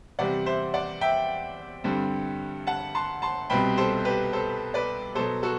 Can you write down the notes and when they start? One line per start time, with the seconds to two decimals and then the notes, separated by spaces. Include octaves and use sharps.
0.19 E2 C3 G3 C4 D5 F#5
0.46 C5 E5
0.74 D5 F#5
1.01 E5 G5
1.84 G2 D3 G3 C4
2.67 F#5 A5
2.95 A5 C6
3.22 A5 C6
3.50 C2 B2 G3 C4 G5 B5
3.77 A4 C5
4.05 G4 B4
4.33 A4 C5
4.74 B4 D5
5.15 B2 F#3 B3 A4 C5
5.43 F#4 A4